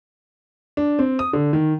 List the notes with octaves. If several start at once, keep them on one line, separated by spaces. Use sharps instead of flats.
D4
C4
D#6
D3
D#3